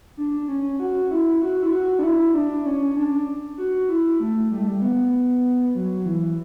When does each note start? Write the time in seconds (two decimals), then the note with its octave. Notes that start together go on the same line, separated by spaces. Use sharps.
0.17 D4
0.48 C#4
0.80 F#4
1.11 E4
1.41 F#4
1.63 E4
1.72 F#4
1.99 D4
2.03 E4
2.34 D4
2.65 C#4
2.96 D4
3.58 F#4
3.89 E4
4.20 A3
4.51 G3
4.59 A3
4.68 G3
4.82 B3
5.75 F#3
5.94 F#3
6.06 E3